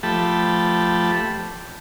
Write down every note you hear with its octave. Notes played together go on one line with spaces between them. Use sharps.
F3 A3 G4 A5 B5